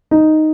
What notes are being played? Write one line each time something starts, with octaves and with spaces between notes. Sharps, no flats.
D#4